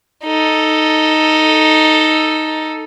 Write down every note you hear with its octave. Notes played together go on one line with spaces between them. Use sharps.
D#4 A4